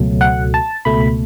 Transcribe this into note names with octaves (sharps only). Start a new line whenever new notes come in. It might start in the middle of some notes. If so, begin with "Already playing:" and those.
Already playing: C#2 B2 F#3 A3
F#5
A5
C#2 B2 A3 B5